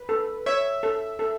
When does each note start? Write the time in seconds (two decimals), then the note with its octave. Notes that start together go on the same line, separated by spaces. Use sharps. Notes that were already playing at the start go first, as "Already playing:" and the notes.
Already playing: B4
0.09 A4
0.46 C#5 E5
0.83 A4
1.19 A4